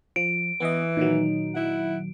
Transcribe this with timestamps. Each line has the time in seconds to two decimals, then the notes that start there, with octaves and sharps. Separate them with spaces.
0.16 F3 D7
0.60 E3 B3 D#5
0.97 A#2 D#3 F#3 D#4
1.54 E4 F#5